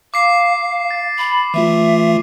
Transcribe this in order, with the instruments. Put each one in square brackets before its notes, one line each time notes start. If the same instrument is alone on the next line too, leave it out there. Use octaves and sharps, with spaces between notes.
[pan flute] F5 [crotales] D6 C7
[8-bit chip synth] A6
[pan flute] B5
[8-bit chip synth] E3 A3 F4 [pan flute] E5